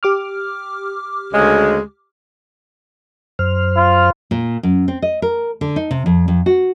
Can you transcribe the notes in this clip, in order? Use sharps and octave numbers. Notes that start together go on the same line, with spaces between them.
G4 D6 F6
D2 C#3 G#3
F#2 C5 F6
F4
A#2
F#2
C4
D#5
A#4
D3
D#4
C3
F2
F2
F#4